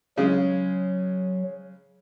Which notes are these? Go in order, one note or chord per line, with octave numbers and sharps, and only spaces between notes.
C#3 F#3 G#3